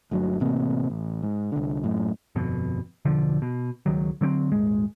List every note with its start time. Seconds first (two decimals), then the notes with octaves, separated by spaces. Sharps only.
0.11 G1 D2 F#3
0.40 A1 C3 A#3
0.90 A1
1.22 G#2
1.52 C2 D3
1.84 F#2 A2
2.35 G1 F2 B2
3.05 E1 B1 D3 F3
3.42 B2
3.86 C#2 D#3 F#3
4.21 D3 F#3 A3 C4
4.51 D#1 G#1 G#3